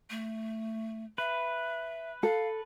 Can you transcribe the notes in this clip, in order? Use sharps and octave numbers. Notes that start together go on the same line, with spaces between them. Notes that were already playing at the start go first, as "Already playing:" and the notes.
A3
B4 E5
A4 F5